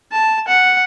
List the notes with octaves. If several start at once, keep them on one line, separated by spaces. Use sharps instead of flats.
A5
F#5